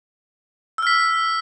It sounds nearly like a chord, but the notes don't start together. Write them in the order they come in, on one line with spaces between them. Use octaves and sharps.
E6 F6 B6